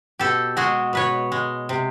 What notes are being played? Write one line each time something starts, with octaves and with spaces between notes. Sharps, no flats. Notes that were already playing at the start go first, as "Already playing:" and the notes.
B2 G4 A4
G#3 F#4 G#4
B2 B4 C#5
G#3
C3